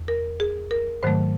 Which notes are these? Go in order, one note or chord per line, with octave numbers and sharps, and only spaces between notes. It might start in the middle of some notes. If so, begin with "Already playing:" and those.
Already playing: E2
A#4
G#4
A#4
G#2 D#3 F#3 A3 C5